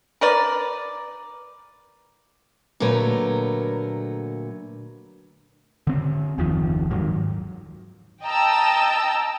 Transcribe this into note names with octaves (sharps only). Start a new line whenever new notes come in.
A#4 B4 D5
A#2 D3 F#3 A3 A#4 B4
D3 C4
F#1 D#2 D#3 F3
G#2 D#3 F#3
D#5 G5 A5 A#5 E6